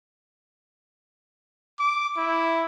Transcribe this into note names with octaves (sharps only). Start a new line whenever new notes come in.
D6
E4